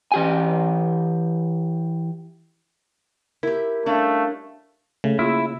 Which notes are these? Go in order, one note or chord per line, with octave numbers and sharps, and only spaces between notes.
E3 G4 G#5
E4 G4 A#4
G3 A3 C#4 D4 F5
C#3 A3
A#3 E4 F4 G#4 E6